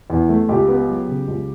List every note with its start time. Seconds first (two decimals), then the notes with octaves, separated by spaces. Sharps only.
0.10 E2
0.29 A3
0.49 C#2 G4
0.68 B3
0.88 F#3
1.08 C#3
1.28 C#2